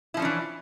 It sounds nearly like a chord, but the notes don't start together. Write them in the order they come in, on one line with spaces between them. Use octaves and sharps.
E4 F3 C#4 D4 E3